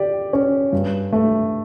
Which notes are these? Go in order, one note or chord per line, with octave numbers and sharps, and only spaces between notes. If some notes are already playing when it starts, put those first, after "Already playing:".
Already playing: G4 D5
C#4
G2
A3